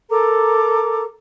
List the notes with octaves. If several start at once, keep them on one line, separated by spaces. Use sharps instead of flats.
A4 A#4 A#5 D6